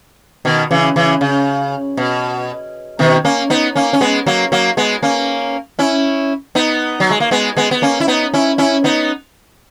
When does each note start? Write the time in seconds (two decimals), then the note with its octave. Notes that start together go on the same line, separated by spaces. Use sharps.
0.45 B2 D#3
0.71 C#3 E3
0.96 C#3 E3
1.21 C#3
1.97 B2
2.99 B2 D#3
3.25 A#3 C#4
3.50 B3 D#4
3.75 A#3 C#4
3.93 C#4
4.01 G#3 B3
4.26 F#3 A#3
4.52 F#3 A#3
4.77 G#3 B3
5.03 A#3 C#4
5.79 C#4 E4
6.55 B3 D#4
7.00 F#3
7.11 G#3
7.20 A#3
7.31 G#3 B3
7.57 G#3 B3
7.71 B3
7.82 A#3 C#4
8.00 E4
8.08 B3 D#4
8.34 C#4 E4
8.58 C#4 E4
8.84 B3 D#4